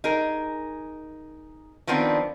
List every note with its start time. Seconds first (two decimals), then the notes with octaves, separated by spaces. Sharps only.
0.04 D#4 G#4 A#4
1.87 D#3 F3 B3 C4 D4